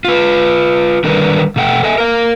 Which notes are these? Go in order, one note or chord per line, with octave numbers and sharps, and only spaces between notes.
F4 B4
D3 D#3 G3 A#4 B4 D5
B2 A3 F#5 G5
A4 D#5 E5 G#5
A#4 F5